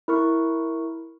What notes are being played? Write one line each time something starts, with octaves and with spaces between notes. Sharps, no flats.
E4 A#4 C#6